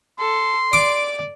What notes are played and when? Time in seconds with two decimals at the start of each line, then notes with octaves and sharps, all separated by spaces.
0.19 A4 C6
0.73 D5 D6